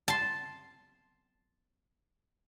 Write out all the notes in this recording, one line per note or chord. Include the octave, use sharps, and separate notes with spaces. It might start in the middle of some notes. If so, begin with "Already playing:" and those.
A5 C6